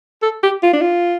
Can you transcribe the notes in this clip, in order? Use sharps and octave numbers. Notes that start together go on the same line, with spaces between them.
A4
G4
F4
D4
F4